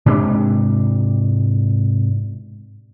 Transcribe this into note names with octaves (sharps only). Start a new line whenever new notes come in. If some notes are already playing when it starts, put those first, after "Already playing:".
G#2 C3 D4